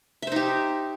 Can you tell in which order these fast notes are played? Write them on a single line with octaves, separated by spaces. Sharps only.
E5 C5 D#4 G4